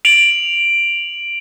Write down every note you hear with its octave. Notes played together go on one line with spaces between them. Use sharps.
D7 F7 F#7